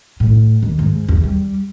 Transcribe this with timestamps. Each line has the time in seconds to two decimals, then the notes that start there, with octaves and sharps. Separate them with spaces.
0.20 A2
0.63 D#2
0.79 G#2
1.09 E2
1.24 G3